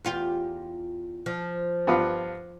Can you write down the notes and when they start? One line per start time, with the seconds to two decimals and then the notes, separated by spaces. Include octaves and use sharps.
0.05 E2 F4 G4
1.26 F3
1.87 G2 B3 F4